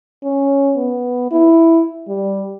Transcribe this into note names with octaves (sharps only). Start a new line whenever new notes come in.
C#4
B3
E4
G3